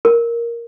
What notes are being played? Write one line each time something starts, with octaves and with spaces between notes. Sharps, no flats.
A#4